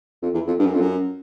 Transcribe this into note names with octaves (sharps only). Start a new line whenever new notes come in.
F2
E2
F2
G2
F#2
F2
F#2